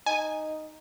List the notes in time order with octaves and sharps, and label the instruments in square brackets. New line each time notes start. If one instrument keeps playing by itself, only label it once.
[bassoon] D#4 [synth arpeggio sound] G#5